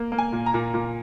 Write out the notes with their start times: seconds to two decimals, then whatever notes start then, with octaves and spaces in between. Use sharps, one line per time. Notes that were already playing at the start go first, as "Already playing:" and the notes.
Already playing: A#3
0.12 A#3
0.18 G#5
0.32 A#2
0.46 A#5
0.54 A#2
0.74 A#2